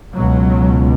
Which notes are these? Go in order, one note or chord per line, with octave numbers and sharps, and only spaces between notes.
C#2 B2 F#3